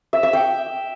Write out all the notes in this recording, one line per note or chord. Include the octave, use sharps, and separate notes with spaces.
E5
E5
G5